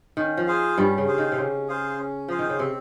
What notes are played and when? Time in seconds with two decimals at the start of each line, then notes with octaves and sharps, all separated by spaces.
0.17 D#3 C#4
0.37 F3
0.47 G#4 C5 F5
0.78 G2 G3 C#4
0.98 C#3
1.07 G#4 C5 F5
1.18 D#3
1.32 C3
1.38 C#3 C#4
1.68 G#4 C5 F5
1.99 C#4
2.28 F3 G#4 C5 F5
2.39 D#3
2.49 C#3
2.59 C3 C4